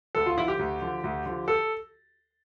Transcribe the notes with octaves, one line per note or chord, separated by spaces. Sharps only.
D2 A4
F4
D3 F3 E4
G4
D2
D3 F3
D2
D3 F3
A4